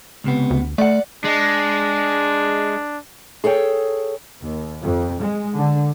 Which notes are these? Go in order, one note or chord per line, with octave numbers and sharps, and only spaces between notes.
C#2 C3 B3
D2
A3 D5 F#5
G#3 D4
G#4 A4 C#5 G5
D#2
F2
G#3
D3